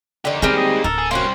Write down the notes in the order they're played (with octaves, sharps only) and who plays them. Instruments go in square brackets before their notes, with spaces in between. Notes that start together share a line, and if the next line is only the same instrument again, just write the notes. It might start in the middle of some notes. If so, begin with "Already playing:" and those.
[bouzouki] D3 D5 [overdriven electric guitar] D#4 G4
[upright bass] D#3 G#3 [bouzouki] G3 C4 G#4 [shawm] A#4
[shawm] D#5
[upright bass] D1 [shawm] A4 [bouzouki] A#4
[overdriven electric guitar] G#4
[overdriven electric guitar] G3 C4 [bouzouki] A#3 C#4 F#4 [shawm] C6